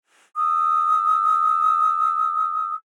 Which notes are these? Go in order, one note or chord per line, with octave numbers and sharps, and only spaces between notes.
D#6 E6